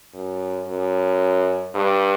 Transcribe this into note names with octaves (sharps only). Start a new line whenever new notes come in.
F#2
F#2
G2